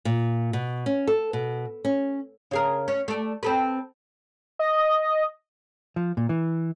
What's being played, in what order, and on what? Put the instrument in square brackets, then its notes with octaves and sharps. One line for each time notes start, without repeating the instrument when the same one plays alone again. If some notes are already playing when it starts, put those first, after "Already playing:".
[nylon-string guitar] A#2
B2
C#4
A4
B2
C#4
[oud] C#3 G#4 A#4
C#4
A3 D5
C4 A4 B4
[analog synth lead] D#5
[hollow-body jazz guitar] F3
A#2
E3